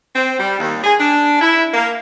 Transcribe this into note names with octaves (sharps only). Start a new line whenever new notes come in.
C4
G3
D#2
G#4
D4
E4
A#3